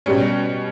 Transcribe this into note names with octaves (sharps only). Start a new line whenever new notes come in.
B2 G3 C#4